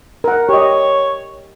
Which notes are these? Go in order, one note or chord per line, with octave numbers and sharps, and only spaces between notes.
A#4 F#5
G4 C#5 D#5